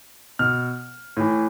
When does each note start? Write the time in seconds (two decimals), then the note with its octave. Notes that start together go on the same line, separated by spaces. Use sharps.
0.39 B2 F6
1.17 A2 E3